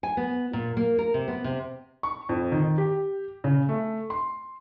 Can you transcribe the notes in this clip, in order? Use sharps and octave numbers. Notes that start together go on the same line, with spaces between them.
G#5
B3
A#2
A#3
A#4
C3
B3
C3
C#6
F2
D#3
G4
C#3
A3
C6